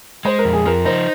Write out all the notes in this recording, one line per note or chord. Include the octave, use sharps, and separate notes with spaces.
G#3 C5
A#4
F2
G#4
F3 A#4
D#4 C5